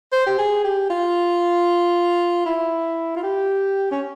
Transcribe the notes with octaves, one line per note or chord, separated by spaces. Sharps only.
C5
G4
G#4
G4
F4
E4
F4
G4
C#4